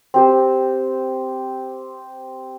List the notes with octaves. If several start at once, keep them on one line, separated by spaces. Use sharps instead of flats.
C4 G4 C5